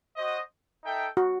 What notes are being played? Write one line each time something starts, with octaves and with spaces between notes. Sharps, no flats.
F#4 C5 D#5
D#4 A4 E5 G5
F#4